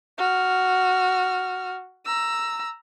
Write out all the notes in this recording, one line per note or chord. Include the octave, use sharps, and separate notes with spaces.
F#4 F6
A#5 E6